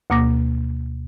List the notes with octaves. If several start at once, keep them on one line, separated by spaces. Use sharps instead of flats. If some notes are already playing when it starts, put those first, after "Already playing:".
D2 B2 A#3 D6 A#6